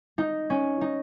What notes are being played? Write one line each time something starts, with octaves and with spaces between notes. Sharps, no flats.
D#4
C#4
D#4